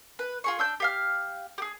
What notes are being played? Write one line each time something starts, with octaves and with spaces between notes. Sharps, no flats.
B4
F4 G#4 C#6
D4 E6 G6
G4 F5 F6
G4 G#4